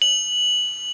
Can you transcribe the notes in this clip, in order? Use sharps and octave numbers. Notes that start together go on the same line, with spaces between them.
F#7